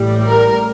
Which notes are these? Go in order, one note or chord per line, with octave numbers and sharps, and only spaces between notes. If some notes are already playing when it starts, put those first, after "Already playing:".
Already playing: A1 A2 G3
A#4